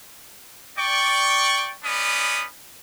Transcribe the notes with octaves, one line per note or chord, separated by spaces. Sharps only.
D5 G5 C#6
B3 C#4 D#4 D5 B5 D#6